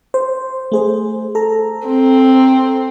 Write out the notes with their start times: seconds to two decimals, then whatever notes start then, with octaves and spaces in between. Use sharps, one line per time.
0.14 C5
0.72 A3 G#4 C5
1.35 A4 A#5
1.88 C4